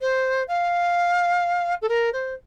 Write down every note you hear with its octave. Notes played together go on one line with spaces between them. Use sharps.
C5
F5
A4
A#4
C5